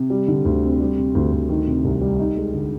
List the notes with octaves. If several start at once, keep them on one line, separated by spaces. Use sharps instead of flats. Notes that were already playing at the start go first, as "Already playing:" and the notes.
Already playing: C3
G3
D3
D2
C4
G3
C3
D2
D2
D#3
C3
C2
G3
D#4
G#3
D3